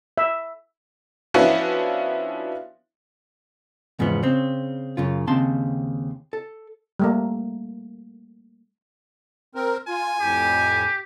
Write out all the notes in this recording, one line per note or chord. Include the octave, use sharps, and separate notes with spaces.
E5
F3 B3 C#4 D4 E4 F#4
E2 G#2 C#3 F3 B3
C#3 C4
F#2 C#3 F4
D#2 C#3 C4 A5 C6
A4
G3 A3 A#3
C4 A#4
F4 G#5
F2 A2 G4